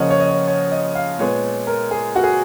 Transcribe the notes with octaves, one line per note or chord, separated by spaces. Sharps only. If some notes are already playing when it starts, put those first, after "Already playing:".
Already playing: C#3 F3 A#3 C#5 D#5 F#5
C#5
D#5
C#5
C#5
D#5
F5
A#2 G#3 B3 C#5
A#4
G#4
F#4
G#4